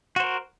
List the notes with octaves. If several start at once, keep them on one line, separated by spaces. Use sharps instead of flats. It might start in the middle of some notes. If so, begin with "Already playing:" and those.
F#4 A#4 C5